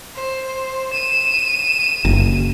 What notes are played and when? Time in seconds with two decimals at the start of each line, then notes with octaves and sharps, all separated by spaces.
0.15 C5
0.91 D#7 E7
2.05 F#1